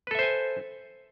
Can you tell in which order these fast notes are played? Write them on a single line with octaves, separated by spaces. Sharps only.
B4 A4 E5 C5 G#5